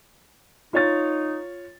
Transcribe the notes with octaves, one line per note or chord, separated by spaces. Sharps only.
D#4 F4 C#5 A6